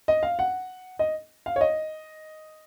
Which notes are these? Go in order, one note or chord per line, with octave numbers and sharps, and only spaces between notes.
D#5
F5
F#5
D#5
F5
C#5
D#5